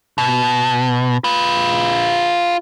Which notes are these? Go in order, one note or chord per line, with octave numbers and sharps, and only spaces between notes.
B2
F4 B4